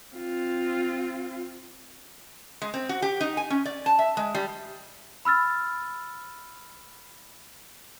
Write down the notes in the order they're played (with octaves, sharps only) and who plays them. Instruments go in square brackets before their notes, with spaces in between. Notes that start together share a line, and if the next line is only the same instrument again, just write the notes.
[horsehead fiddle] C4 F4
[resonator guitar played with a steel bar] G#3
C4
F#4
G4
D#4
G#5
C#4
D5
A5
E5
G#3
G3
[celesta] B5 E6 F6 A6